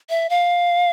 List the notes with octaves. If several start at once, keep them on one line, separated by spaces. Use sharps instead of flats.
E5
F5